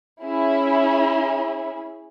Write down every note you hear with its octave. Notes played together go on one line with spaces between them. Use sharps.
C#4 E4 G#4